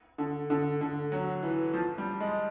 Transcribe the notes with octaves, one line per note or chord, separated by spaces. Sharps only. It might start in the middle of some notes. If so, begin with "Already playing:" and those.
D3
D3
D3
F#3
E3
F3
G3
G#3